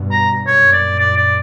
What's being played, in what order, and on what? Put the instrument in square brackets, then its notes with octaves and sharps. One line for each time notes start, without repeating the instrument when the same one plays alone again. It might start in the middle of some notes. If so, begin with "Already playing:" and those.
Already playing: [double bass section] G2 B2
[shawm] A#5
[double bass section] F#2 A#2 [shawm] C#5
[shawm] D5
D5
D5